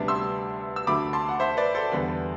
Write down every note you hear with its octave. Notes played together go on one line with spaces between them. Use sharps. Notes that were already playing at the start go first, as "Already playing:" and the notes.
Already playing: D2 C3 G3 B3 D4
C6 E6
E6
D2 D3 F#3 A3 B5 D6
A5 C6
F#5
C5 E5
B4 D5
A4 C5
E2 D3 G3 B3 B4